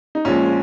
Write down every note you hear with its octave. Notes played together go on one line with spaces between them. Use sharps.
D#4
A#1 A#2 F3 G#3 C#4